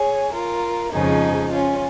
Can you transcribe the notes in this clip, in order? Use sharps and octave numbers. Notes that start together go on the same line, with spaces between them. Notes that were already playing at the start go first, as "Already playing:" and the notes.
Already playing: G#4 C#5
F4 A#4
F2 C#3 F3 G#3 D#4 G#4
C#4 F4